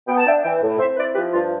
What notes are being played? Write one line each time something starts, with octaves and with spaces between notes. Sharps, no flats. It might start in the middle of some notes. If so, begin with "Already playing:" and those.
B3 G5
A5
D4 E5 G5
E3 E5 G5
A2
C4 C5 E5
E4 B4 D5
F3 G4 B4
G2 F4